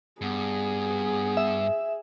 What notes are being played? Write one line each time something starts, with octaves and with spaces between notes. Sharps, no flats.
G2 B3 G#4
E5